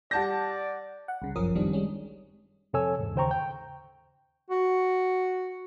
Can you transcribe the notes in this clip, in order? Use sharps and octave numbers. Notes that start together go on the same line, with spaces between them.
G3 D5 F#5 A5 G6 A#6
F#5
C2 C#3
G1 F#2 F3 C#4 A#4 D#6
D#3 G3 C4 D4
G3 G#3 C#4
F2 C3 A4 C#5 G#5 E6
E2 G#2
D#2 C#3 C5 G5 A#5 C#6
G5
F#4